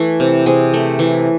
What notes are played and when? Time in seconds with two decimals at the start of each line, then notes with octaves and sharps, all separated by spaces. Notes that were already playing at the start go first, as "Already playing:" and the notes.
Already playing: E3 A3
0.20 C3
0.46 C3 G#4
0.73 A3
0.99 E3